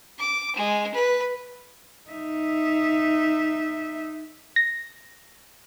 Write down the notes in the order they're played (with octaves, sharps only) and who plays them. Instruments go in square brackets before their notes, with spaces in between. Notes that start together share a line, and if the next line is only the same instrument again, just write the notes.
[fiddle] D6
G#3
B4
[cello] D#4 E5
[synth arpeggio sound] A#6